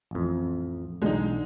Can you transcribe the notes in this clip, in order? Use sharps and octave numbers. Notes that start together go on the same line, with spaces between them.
A1 F2
B1 E2 D3 G#3 D#4